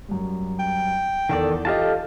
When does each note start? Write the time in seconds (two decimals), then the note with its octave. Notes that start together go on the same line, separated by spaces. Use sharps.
0.08 F#2 G3
0.59 G5
1.29 E2 D#3 A4 D5
1.65 F4 G4 A4 D#5 F5 A5